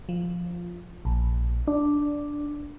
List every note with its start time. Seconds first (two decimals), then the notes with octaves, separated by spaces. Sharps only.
0.09 F3
1.05 A#1
1.68 D4